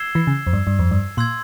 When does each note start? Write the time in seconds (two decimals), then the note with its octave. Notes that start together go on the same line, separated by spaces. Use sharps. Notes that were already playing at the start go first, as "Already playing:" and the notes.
Already playing: E6 G#6 C7 E7 G7
0.15 E3
0.27 C#3
0.47 F2
0.53 G2
0.67 G2
0.79 F2
0.91 G2
1.17 A#2 C6 E6 G#6